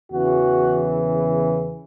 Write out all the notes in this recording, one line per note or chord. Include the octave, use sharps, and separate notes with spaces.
E2 C#3 E3 F#4